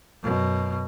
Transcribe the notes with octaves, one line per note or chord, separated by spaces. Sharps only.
F#2 B2